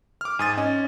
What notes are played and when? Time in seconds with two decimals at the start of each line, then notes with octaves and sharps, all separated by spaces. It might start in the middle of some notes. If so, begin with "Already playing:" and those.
0.21 D6 F6
0.39 G#2 G#5 D#6 A6
0.57 C#4 D#5